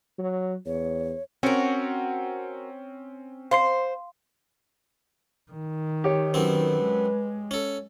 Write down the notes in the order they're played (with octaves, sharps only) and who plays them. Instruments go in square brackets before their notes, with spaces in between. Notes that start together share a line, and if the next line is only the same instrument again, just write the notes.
[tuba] F#3
[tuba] E2 [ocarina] C#5
[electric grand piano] C4 C#4 [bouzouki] F#4 A#4
[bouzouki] C5 [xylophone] F5 C6 C7
[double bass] D#3
[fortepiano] G4 C#5
[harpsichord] F#2 C4 [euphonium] B4
[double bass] G#3
[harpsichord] C#4 A4